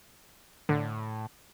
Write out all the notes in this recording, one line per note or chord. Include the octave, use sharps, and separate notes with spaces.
A2 D3